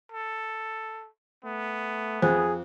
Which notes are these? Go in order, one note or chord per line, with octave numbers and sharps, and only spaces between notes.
A4
A3 B3
F2 G#4 C5